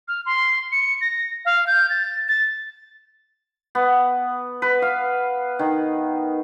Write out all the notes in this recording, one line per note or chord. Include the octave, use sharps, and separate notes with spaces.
F6
C6
C#7
A#6
F5
G6
A6
A6
B3
B4
F5
D#3